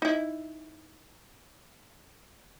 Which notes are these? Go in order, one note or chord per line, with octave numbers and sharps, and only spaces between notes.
D#4 E4